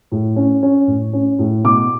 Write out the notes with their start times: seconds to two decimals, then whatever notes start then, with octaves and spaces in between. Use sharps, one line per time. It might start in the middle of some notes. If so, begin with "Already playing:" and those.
0.12 A2
0.36 C#4
0.63 C#4
0.87 A2
1.13 C#4
1.39 A2
1.64 B2 D6